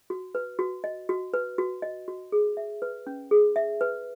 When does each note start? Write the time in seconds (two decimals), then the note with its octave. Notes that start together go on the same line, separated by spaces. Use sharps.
0.10 F#4
0.35 B4
0.59 F#4
0.84 D#5
1.09 F#4
1.34 B4
1.58 F#4
1.82 D#5
2.08 F#4
2.32 G#4
2.57 E5
2.82 B4
3.07 C#4
3.31 G#4
3.56 E5
3.81 B4